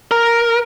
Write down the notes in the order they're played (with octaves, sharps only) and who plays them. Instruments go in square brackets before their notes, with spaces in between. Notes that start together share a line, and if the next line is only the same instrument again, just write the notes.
[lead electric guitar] A#4